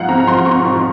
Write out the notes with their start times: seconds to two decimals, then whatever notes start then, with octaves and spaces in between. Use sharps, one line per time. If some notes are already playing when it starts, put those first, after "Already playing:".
Already playing: G#2 F3 F5 F#5
0.09 C4 A#5
0.20 A#5
0.27 F3 C6
0.45 C4 C#6
0.65 F3